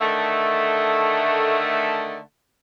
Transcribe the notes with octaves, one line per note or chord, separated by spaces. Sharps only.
D3 D#3 A3